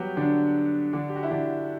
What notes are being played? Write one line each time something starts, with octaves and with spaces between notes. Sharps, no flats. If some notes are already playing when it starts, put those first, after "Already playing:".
Already playing: F#3 G3 B3 F#4 G4 B4
D3 D4
D3 D4
G4
F#4
E4
D3 D4